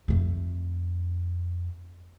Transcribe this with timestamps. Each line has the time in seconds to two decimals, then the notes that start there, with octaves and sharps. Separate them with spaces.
0.08 F2 A3